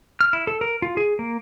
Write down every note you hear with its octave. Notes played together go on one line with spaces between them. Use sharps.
F6
E4
A4
A#4
F4
G#4
A#3